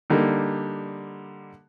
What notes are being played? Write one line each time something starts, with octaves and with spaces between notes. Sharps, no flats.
D3 G3 A#3 D#4